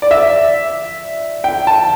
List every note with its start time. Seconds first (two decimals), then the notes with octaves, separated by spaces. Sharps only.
0.02 D5
0.11 E5
1.44 G5
1.67 A5